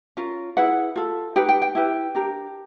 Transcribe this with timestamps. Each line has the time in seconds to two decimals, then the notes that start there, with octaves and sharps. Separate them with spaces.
0.17 C#4 F4 A#4
0.57 E4 G#4 B4 F#5
0.96 F4 A4
1.36 D#4 G4 B4 G5
1.49 G5
1.62 G5
1.75 E4 G4 B4
2.15 D4 G4 A#4